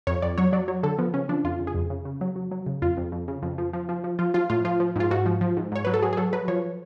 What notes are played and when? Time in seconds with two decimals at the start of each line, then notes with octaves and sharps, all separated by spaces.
0.07 F2 C#5
0.22 F2 D5
0.38 F#3 C#5
0.52 F#3 D5
0.68 F#3 C#5
0.83 D3 A4
0.98 F3 B3
1.14 C#3 C#4
1.29 F3 D4
1.44 F2 F4
1.60 C#3
1.67 G#4
1.75 F2
1.90 C#3
2.05 C#3
2.21 F#3
2.36 F#3
2.51 F#3
2.67 C#3
2.82 F2 F4
2.97 F2
3.12 F2
3.28 C#3
3.42 F2
3.58 F3
3.73 F3
3.89 F3
4.04 F3
4.19 F3 F4
4.34 F3 F4
4.50 A2 F4
4.65 F3 F4
4.80 F3
4.96 G#2 F4
5.11 G#2 F#4
5.26 F3
5.41 F3
5.57 G#2
5.72 G#2 C#5
5.85 F#3 B4
5.94 A4
6.02 F#3 G#4
6.13 G#4
6.17 F#3 A4
6.33 F#3 B4
6.48 F3 C#5